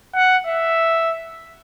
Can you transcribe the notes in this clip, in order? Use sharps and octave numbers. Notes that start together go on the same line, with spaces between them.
F#5
E5